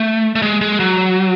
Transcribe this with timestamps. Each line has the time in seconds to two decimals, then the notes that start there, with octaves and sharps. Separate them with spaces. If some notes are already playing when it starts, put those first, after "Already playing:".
Already playing: A3
0.35 A3
0.42 G#3
0.61 G#3
0.80 F#3